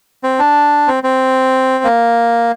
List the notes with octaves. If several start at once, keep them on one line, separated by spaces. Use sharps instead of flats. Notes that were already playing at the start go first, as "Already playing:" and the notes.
C4
D4
C4
C4
A#3